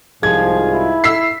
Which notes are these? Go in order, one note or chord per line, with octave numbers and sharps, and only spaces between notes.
C2 G#2 F3 F4 G#4 G#6
E4
E6 B6 C7